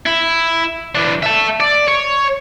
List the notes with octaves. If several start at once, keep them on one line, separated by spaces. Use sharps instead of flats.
E4
E3 D4
E5 A5
D5
C#5